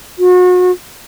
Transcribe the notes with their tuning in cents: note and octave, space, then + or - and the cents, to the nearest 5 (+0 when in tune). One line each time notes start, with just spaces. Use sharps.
F#4 -35